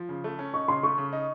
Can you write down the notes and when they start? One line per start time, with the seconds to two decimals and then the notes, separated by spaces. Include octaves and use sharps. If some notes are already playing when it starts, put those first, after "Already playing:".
Already playing: F3
0.09 C#3
0.24 A3
0.39 C#4
0.54 D#4 C#6
0.68 C#3 C6
0.83 A3 C#6
0.98 C#3
1.13 D#4